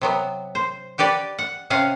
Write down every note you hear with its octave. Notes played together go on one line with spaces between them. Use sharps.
C3 F#3 B3
C5
F#4 G4 B4 D5
F#5
C3 C#4 F5 F#5